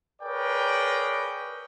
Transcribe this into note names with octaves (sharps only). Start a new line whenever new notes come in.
G#4 A#4 B4 C#5 D5 G5